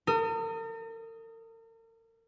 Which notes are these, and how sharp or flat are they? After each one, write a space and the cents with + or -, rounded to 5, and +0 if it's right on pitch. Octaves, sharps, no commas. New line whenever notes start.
A#4 -45 D#6 +10